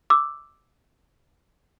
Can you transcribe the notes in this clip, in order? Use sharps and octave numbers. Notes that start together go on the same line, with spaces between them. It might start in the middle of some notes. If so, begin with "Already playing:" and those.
D6 E6